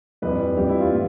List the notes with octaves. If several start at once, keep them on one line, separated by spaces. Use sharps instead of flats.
F2 E3 G3 B4
F2 E3 G3 G4
E4
F4
A2 E4